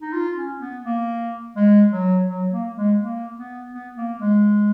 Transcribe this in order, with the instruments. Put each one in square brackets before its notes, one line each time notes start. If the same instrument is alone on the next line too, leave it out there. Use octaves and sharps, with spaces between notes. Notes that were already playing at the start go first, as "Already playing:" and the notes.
[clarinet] D#4
F4
C#4
B3
A#3
G#3
F#3
F#3
A#3
G#3
A#3
B3
B3
A#3
G#3